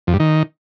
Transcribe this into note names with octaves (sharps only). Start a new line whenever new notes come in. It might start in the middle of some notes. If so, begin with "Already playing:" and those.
F2
G2
D#3